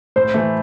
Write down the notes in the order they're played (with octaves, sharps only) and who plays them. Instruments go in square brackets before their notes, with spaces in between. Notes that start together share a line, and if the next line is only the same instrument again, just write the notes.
[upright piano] A2 [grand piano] C5
[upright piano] E3 A3